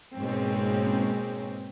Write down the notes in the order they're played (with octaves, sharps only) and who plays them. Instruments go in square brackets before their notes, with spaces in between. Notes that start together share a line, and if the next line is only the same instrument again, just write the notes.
[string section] G#2 B2 G#3 A#3 C4 C#4